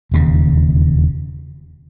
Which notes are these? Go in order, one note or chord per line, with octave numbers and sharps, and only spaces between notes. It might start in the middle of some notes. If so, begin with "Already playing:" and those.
E1 D#2 C#3